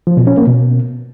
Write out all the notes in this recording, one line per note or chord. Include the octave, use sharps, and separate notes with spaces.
F3
B2
C#4
A#3
B2